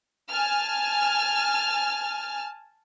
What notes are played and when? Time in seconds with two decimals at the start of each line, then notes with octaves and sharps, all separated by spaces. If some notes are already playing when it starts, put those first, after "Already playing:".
0.29 G#5 A5 F6